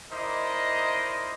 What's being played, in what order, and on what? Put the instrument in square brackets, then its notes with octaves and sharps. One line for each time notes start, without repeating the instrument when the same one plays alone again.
[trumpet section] D#4 E4 A#4 C5 D5 D#5